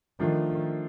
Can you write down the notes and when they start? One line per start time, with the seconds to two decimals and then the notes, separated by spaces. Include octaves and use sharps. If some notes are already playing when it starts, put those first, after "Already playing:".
0.20 D#3 F3 A3 D4 F4